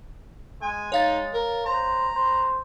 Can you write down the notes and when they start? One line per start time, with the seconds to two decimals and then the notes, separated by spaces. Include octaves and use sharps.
0.62 G#3 G#5
0.92 D#4 C#5 F5 A6
1.33 A#4
1.65 C5 A#5
2.16 C5